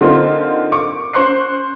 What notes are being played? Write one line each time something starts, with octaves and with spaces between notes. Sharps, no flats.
D3 A#3 C4 D#4 F4 C5
C#6 D6
C#4 C5 C#6 F#6 C7